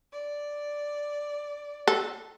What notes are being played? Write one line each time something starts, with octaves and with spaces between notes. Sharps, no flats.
D5
A4